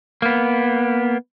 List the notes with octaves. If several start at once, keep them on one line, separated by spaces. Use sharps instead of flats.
A#3 B3